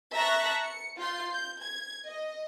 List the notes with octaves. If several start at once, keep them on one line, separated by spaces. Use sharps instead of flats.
E5 A5 A#5 C#6 F#6
C#7
F4 C6 G6
G6
G#6
D#5